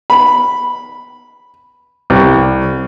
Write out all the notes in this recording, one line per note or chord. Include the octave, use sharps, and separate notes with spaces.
B5
C2